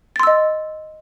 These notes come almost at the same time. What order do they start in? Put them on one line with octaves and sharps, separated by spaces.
A6 C6 E6 D#5